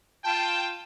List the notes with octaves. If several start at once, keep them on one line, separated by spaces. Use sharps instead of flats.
F4 G5 A5